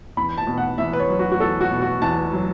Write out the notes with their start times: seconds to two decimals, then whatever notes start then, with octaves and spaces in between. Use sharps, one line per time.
0.17 E2 B5
0.38 A5
0.47 B2
0.58 F#5
0.78 E2 E5
0.93 B4
1.00 C#5
1.10 F#3
1.19 F#4
1.32 F#4
1.40 E2 A4
1.61 F#4
1.71 B2
1.82 F#4
2.02 E2 A5
2.33 F#3